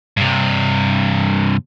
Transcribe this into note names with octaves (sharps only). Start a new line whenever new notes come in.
G2 C3